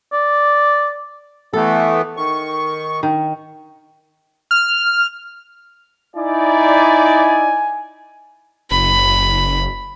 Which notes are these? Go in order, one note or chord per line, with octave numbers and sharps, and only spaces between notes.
D5
E3 A3 B3 A4
D#3 C#6
D#3
F6
D#4 E4 D5 G#5
F#1 B5